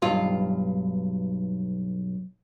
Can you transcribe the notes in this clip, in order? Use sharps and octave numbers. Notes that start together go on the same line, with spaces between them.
B1 G2 F4